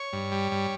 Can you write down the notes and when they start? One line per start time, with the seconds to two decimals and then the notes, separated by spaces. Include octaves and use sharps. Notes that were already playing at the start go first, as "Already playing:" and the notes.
Already playing: C#5
0.13 G2
0.32 G3
0.52 G2